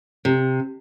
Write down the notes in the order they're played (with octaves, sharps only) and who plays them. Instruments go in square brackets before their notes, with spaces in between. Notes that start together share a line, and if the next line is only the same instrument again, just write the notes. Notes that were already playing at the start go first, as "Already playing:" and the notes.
[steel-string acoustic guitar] C3